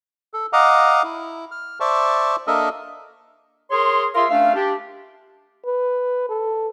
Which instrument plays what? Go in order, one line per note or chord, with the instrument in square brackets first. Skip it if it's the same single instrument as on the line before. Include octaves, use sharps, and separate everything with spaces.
[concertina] A4
D#5 F5 F#5 A#5 D6
E4
F6
C5 D5 E5 A5 C#6
A#3 D4 A4 A#4 D#5 E5
[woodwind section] G#4 A#4 C#5 C6
F4 G#4 A#4 E5 F5 C6
A3 C#4 D4 E5 F5
D4 G4
[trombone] B4
A4